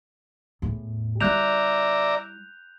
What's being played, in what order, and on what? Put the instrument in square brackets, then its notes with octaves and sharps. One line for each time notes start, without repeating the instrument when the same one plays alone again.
[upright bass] E2 A2
[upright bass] G3 E4 [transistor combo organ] D5 E5 A#5 [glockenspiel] F#6 G6 F7